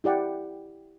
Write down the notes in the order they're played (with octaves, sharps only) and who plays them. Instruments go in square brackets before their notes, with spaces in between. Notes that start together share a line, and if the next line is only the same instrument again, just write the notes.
[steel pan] E4 G4 D5 F#5 G5